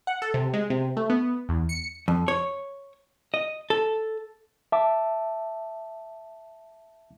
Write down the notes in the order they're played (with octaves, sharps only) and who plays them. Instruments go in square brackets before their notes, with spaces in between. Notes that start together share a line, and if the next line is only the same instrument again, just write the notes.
[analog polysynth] F#5
A4
C3
G#3
C3
A3
B3
E2
C#7
[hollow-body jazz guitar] F2
C#5
D#5
A4
[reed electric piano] E5 A5 D6